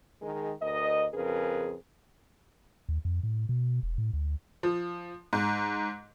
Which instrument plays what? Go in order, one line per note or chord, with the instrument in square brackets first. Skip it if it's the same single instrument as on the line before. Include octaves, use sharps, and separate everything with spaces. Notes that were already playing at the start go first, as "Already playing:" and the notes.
[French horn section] D#3 G#3 G#4 A#4
D2 A#4 D#5
F2 C#3 G#4 A#4 B4
[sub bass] D#2
F2
A2
B2
E1
A2
D2
[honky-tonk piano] F3
G#2